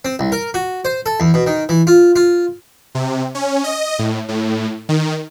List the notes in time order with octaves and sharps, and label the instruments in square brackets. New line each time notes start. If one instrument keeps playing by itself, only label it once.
[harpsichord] C4
C2
A#4
F#4
C5
A4
E2
B2
D#3
E3
F4
F4
[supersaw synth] C3
C#4
D#5
A2
A2
D#3